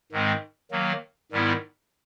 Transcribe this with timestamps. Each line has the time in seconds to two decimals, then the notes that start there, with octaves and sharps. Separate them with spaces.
0.12 G#2 D#3 G#3 C4
0.71 D#3 F#3 A#3
1.32 G#2 D#3 G3 B3 E4